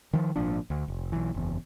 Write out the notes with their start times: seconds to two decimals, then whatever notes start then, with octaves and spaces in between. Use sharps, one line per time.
0.13 D#3 F3
0.36 G#1 A#2 F3 D4
0.70 D2
0.88 F1
1.12 B1 E3
1.34 F#1 E2